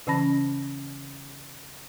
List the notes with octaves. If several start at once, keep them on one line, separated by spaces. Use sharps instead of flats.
C#3 E3 C#4 A5 B5 A#6